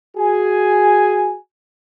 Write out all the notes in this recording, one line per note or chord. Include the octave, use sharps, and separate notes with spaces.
F#4 G#4 G#5